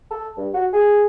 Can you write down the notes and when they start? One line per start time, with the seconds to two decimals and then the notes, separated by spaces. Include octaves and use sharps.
0.11 A4
0.37 G2
0.54 F#4
0.73 G#4